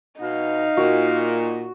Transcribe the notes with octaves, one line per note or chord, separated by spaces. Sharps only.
B2 D#4 F5
A#2 F#4